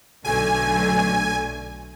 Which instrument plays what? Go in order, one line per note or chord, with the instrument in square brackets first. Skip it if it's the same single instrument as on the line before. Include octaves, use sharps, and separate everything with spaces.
[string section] B1 D3 A3 [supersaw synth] G#5